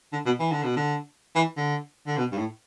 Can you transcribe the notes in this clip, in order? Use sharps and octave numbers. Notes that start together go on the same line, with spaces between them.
D3
B2
E3
D3
B2
D3
E3
D3
D3
B2
G2
A2